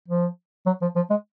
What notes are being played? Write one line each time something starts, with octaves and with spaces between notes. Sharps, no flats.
F3
F#3
F3
F3
G#3